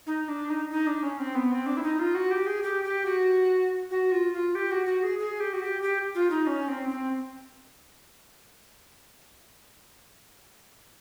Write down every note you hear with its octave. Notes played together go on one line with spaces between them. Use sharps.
D#4
D4
D#4
D#4
D4
C#4
C4
B3
C4
D4
E4
D#4
F4
F#4
G4
G#4
G4
G4
F#4
F#4
F4
F4
G4
F#4
F#4
G#4
G#4
G4
F#4
G4
G4
F4
D#4
C#4
C4
C4